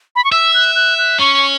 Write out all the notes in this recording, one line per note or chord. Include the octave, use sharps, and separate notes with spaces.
B5
C#6
E5 E6
F#6
F#6
F#6
C#4 C#6